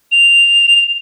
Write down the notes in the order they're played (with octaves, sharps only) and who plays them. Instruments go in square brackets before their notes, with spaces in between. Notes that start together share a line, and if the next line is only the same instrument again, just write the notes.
[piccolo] F7